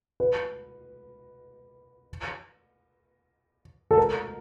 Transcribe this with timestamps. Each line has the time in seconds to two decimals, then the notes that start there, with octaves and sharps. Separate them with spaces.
0.20 B4
3.91 A4
3.97 A#4